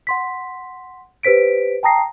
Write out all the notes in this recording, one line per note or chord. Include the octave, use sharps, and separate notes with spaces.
F#5 C6 B6
G4 B4 C5 B6 D7
G5 A5 A#5 D#6 A#6 C7